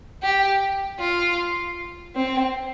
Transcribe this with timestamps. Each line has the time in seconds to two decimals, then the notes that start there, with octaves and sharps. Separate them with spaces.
0.23 G4
0.99 F4
2.15 C4